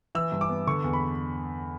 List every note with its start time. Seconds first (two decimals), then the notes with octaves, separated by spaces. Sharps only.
0.15 E3 E6
0.32 G2
0.41 D6
0.49 B3
0.67 D3 C#6
0.84 E2
0.93 B5